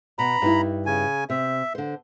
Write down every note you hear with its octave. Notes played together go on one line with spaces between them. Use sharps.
B2 A#5 B5
G2 D#4 E4
C#3 G#5
C3 E5
D3 C5